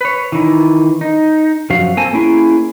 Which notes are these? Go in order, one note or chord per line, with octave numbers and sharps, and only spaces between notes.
B4 C#5
D#3 E3
D#4
F#2 F3 F#4 F5
A#3 C4 A4 G#5 A5
A#3 C#4 E4 G#4